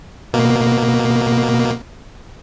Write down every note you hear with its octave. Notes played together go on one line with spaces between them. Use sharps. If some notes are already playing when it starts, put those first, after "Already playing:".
B2 A#3